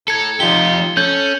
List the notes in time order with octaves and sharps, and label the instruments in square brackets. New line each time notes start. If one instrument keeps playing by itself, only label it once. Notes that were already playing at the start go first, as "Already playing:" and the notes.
[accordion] A2 A#5 [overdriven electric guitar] A4 [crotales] G#6 C#7
[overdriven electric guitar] F3 G4 [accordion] D#4 F4 [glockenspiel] G7
[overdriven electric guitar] C#4 [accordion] A4 [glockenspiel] G6 F#7